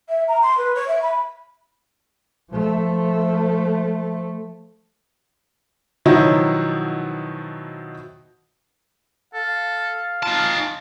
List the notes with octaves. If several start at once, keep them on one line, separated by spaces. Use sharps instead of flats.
E5
A#5
C6
B4
C#5
E5
B5
F3 A3
B2 D#3 F3 F#3 D#4 E4
A4 F5
D#4 F4 A5